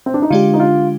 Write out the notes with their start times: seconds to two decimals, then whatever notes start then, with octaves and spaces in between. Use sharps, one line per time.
0.06 C4
0.14 D4
0.22 D#4
0.30 D3 G#3 D4 F4 G4
0.54 D#4
0.60 F4